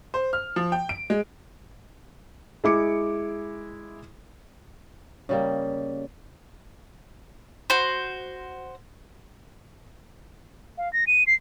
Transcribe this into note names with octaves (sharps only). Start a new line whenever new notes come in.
C5
F6
F3
G5
D7
G#3
G#3 E4 D6 C#7
C#3 G3 A#3
F#4 C5
F5
A#6
D#7
C7